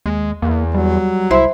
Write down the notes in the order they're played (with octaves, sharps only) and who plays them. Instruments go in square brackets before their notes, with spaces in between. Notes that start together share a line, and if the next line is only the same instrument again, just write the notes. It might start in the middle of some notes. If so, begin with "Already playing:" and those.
[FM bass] D#2 [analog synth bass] G#3
[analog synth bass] E2 [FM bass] A#3
[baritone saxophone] F#3 [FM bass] G3
[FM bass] C2 [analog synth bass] E4 [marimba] C5 E5 C6